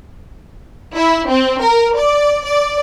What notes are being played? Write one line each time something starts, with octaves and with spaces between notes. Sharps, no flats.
E4
C4
A#4
D5
D5